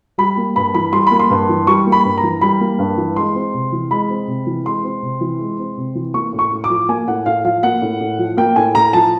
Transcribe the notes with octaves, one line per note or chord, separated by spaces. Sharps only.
G3 B5
A#3
G2 B5
E3 B5
G3 C6
A#3 B5
C6
G2
E3
G3 C#6
A#3
B5
G2
A#5
E3
G3 B5
A#3
G2
E3
G#3 C6
C4
C3
E3
G#3 B5
C4
C3
E3
G#3 C6
C4
C3
E3
G#3
C4
C3
E3
A#3 C#6
A2
C#6
A2
D6
F3
A#3 G#5
A2 F#5
A2 F5
F3 F5
A#3 F#5
A2
A2
F3
A#3 G5
A2 G#5
A2 A#5
F3 A5